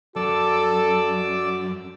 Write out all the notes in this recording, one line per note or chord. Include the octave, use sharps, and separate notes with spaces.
F#2 F#4 A4 D5 D6 E6